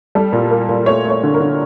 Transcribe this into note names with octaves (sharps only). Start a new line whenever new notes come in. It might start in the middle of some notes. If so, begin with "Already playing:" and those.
G3 A4
A#2
A#3
A#2
A3 C#5
A3
C#5
D3
A#4
D3